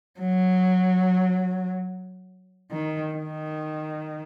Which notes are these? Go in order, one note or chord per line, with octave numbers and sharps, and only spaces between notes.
F#3
D#3
D#3